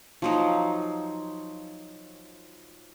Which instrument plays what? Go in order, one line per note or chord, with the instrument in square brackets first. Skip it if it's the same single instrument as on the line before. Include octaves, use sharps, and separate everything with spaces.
[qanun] F3 F#3 D#4